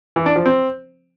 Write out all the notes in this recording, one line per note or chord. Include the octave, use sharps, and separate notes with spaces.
E3
D4
F3
C4